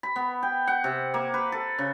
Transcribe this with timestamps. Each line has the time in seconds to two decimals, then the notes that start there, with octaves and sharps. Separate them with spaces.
0.03 B5
0.16 B3
0.43 G5
0.67 F#5
0.84 C3
1.14 A#3
1.34 B4
1.52 A4
1.79 C#3